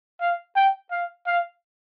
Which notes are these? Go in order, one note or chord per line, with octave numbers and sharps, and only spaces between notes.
F5
G5
F5
F5